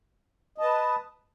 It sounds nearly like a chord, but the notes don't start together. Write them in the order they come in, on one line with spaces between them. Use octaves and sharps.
D#5 A5 B4